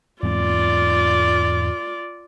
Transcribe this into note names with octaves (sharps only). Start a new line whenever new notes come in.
E2 G#2 C4 F4 D5